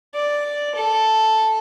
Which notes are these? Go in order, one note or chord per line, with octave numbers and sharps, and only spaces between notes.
D5
A4